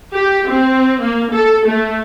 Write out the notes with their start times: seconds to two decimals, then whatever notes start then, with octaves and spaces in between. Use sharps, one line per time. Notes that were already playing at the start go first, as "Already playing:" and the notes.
0.14 G4
0.48 C4
1.00 A#3
1.32 A4
1.67 A3